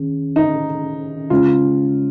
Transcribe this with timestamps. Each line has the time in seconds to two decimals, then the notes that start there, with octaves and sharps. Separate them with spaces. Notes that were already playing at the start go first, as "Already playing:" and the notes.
Already playing: D#3 C#4 G#4
0.36 D#4
1.30 C#3 G#3 C#4 F4